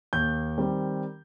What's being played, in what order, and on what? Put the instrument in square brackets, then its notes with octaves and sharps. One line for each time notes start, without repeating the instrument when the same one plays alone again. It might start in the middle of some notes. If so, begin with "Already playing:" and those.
[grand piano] D#2 G6
D#3 G3 C4